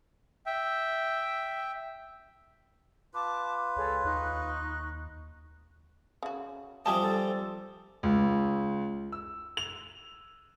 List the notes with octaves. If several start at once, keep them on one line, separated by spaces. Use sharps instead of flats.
E5 G5
F4 B4 A5 D6
C#2 G#4 A4 C#5
D#2 D#4 C#6 F#6
C#3 F#4
F3 G3 C4 E5 G#5 A5 D#6
A4
C#2
E6
F7